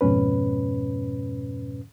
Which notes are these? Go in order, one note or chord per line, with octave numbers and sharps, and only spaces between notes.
F2 G#2 B2 C#4 B4